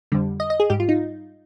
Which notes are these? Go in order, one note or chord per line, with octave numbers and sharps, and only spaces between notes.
F2 D3 G3
D#5
D#5
G#4
G#2 G3 G4
F4
D#4